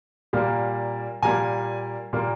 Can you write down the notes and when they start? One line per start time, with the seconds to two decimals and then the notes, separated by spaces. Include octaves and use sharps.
0.33 A#2 G3 A#3
1.22 A#2 G3 A#3 G#5 A#5
2.13 A#2 G3 A#3